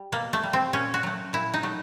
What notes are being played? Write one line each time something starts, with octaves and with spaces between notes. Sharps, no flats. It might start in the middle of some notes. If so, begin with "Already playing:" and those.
Already playing: G3
B2 A#3
A3
G3
C4
A#2 C#4
F#4
F#3 A3
A#2 E4
D#4
F#3 A3